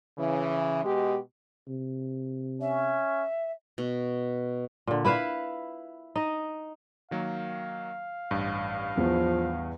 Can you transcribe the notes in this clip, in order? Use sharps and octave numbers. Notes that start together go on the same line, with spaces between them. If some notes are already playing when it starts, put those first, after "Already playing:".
C#3 E3
B2 G#3 G4
C3
C#4 E5
B2
A#2 D3
E4 B4 E5 F5
D#4 D#5
D#3 F#3 A#3 F5
A1 G2
E2 F3